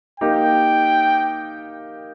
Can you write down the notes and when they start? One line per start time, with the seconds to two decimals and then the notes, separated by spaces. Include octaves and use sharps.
0.20 A#3 D#4 G4 G5